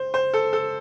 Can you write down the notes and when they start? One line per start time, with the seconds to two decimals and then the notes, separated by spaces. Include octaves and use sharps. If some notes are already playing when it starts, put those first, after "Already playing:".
Already playing: C5
0.14 C5
0.34 A4
0.53 A4